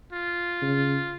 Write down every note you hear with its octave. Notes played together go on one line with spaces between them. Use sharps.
F4
C#3